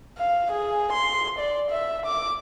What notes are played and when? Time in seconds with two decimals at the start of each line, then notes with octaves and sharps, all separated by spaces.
0.18 F5
0.52 G#4
0.93 C6
1.39 D5
1.71 E5
2.06 D6